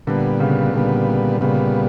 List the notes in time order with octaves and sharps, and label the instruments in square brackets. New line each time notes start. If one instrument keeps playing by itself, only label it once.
[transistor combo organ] A#2 G3 B3 [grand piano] D3
[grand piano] C#3
[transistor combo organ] A#2 G3 B3 [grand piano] D3
[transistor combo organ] A#2 G3 B3 [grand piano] C#3